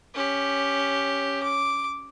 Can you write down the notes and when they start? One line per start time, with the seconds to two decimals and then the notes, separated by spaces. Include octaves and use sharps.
0.14 C#4 G4
1.43 D6